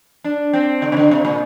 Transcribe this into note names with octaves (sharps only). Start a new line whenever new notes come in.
D4
C4
D3
C3
D3
C3
A#2